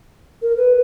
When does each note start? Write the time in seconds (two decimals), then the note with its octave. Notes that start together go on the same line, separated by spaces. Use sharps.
0.41 A#4
0.56 B4